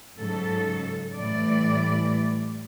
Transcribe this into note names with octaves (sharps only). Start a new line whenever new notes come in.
G#2 C#3 F#3 A4
A2 E3 G3 A3 D5